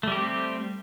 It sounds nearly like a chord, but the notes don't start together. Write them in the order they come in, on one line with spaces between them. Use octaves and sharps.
A3 G3 G4 C4